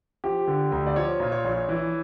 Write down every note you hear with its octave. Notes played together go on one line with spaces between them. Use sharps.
F3 G4
D3
D2
D5
F3 C#5
A#2
C#5
A#1
E3